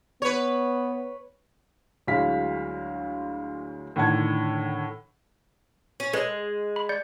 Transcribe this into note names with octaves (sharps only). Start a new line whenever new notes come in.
B3 B4 C#5
D2 F#3 G#3 E4 F5 B6
A2 D3 D#3 F#5 A5 G#6
C#4
G#3 A4 B4 C#5
B5
D5 G6 C#7